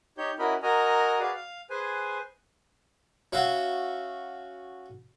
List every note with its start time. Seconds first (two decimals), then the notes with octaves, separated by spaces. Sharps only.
0.18 D#4 G4 C#5 G6
0.39 C#4 E4 F#4 A#4 D#5 B5
0.63 F#4 A#4 D#5 G#5 A#5
1.20 F#4 G#4 B4 D5 F5
1.34 F5
1.70 G#4 B4 C5 G#5
3.33 C#4 F#4 E5 F5